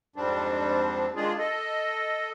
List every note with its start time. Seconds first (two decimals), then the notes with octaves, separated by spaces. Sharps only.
0.16 F2 G#2 G3 C4 D4
1.16 D#3 G#3 D4 F4 G#4
1.39 A4 D#5